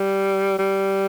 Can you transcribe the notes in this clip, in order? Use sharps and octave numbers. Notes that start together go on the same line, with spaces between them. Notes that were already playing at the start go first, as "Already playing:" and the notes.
Already playing: G3
G3